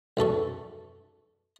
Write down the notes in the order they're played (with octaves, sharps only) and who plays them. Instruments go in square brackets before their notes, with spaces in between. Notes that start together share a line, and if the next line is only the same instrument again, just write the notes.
[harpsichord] B1 F#2 A4 C#6